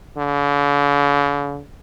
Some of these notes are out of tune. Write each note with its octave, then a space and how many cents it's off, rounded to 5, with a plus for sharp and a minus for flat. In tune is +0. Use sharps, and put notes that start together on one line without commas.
D3 -45